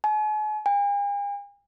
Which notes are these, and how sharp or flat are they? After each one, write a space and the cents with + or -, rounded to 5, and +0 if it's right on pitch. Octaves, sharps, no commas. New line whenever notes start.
G#5 +45
G#5 -45